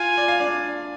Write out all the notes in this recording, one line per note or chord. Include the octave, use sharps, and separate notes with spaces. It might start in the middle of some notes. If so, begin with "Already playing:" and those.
Already playing: F4 F5 G#5
D5
F5
D4 D5